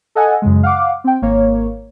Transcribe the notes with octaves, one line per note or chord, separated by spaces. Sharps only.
A4 D#5 F#5 G#5
F#2 C#3 G#3
F5 F#5 D6
C4 G5
G#1 A#3 C#5